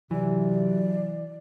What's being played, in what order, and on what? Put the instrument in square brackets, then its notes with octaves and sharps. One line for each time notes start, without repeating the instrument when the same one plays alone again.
[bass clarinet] C3 [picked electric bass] E3 [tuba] F#3 [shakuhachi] D5